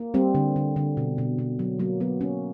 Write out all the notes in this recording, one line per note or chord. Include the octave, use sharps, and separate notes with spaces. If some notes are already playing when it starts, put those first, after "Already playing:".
Already playing: A#3
G3 C4
D3
D3
D3
B2
B2
B2
F#3
F#3 A#3
F#3 B3
A#3 C#4